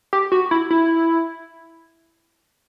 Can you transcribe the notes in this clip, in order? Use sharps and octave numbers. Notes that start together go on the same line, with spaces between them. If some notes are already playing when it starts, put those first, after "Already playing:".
G4
F#4
E4
E4